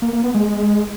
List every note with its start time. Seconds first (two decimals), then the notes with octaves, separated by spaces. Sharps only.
0.02 A#3
0.13 A#3
0.24 B3
0.35 G#3
0.45 G#3